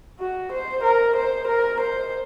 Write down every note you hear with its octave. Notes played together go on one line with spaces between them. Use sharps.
F#4
C5
A#4
C5
A#4
C5